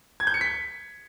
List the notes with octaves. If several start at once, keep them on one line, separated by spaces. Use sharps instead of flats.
G#6
G6
C#7
B6